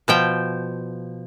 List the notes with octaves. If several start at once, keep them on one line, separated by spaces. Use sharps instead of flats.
B2 F3 G5